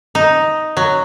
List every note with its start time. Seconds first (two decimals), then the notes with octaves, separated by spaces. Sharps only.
0.15 D#4
0.77 F#3